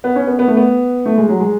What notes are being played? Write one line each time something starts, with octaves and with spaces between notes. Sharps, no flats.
B3
C#4
B3
B3
A3
B3
A3
G#3
F#3
G#3